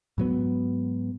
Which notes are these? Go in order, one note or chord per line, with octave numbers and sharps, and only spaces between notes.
G#2 F#3 B3